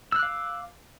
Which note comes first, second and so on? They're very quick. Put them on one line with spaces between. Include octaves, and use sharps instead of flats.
E6 F#6 D6 F5